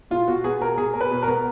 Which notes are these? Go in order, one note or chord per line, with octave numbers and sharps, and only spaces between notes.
B2 F4
B2 F#4
B3 G#4
B2 A#4
B2 G#4
B2 A#4
B4
B2
B3 A#4